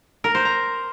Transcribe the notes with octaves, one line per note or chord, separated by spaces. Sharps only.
A#4
C5
A#5